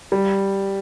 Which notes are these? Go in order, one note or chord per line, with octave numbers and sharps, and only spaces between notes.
G3